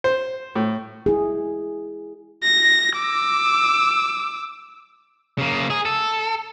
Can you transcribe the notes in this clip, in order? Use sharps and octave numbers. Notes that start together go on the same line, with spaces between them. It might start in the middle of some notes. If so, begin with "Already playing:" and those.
C5
A2
E4 G#4
A#6
D6 E6
C#3 A#3
G#4
A4